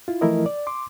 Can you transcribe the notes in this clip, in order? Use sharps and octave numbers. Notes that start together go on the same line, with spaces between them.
E4 F4
E3 F3 A3 E4 A#4 D#5
D5
C6 D6